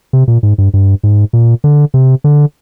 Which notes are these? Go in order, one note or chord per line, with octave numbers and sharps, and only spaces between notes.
C3
A#2
G#2
G2
G2
G#2
A#2
D3
C3
D3